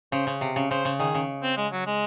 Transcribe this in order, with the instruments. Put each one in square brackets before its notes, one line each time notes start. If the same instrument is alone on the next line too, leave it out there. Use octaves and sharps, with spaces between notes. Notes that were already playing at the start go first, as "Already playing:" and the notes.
[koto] C#3 [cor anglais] C5
[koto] C#3
C3
C#3
[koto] C#3 [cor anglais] C5
[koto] C#3
[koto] D#3 [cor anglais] G#4
[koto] C#3
[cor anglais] C4
G#3
F#3
G#3